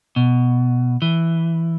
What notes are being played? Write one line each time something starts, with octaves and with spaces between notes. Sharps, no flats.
B2
E3